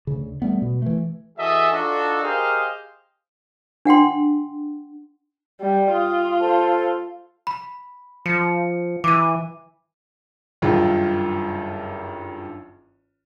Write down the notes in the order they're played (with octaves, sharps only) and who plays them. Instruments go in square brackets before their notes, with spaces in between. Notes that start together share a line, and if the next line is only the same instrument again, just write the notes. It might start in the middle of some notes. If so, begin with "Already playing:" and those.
[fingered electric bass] D2 C#3
G3 A3 B3
B2
E3 A3
[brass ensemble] E3 F#4 G#4 A4 D#5 E5
D4 D#4 F4 F#4 A4
G4 G#4 A#4 C5 D#5 F5
[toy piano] D4 F#5 G5 C6
[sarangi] G3
[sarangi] F4 [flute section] D#6
[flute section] A4 C5 A5
[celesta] B5
[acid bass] F3 [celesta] C#7
[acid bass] E3 [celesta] D6 D#7
[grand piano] F#1 G2 D#3 F4